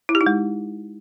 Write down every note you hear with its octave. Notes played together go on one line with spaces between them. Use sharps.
E4
G4
D#4
G#3